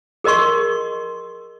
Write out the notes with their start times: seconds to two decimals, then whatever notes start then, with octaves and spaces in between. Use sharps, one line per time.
0.24 G#4 A#4 D#5 C6 C#6